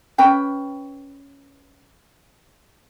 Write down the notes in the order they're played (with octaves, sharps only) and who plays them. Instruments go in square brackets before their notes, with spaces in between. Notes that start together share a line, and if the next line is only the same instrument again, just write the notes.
[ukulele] C#4 B4 G5